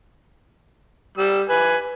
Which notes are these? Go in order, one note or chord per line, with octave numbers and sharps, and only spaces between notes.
G3 E6
B4 G#5